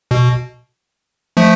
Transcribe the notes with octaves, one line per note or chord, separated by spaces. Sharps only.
B2
F3 A3